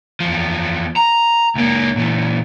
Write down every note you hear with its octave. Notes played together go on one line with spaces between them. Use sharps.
E2 F3
A#5
C#2 A#3
A#2 E3